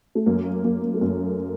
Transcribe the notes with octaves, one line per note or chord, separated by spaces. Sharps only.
A3
F#2 A#3
F#2 A#3
A#3
A3
F#2 A#3